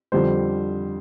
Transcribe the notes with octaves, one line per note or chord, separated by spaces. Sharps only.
F2 D3 G3 D4 C5